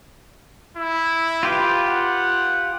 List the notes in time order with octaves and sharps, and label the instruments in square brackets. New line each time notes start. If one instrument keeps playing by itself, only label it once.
[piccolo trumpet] E4
[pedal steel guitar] F4 G4 B4
[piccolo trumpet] F#5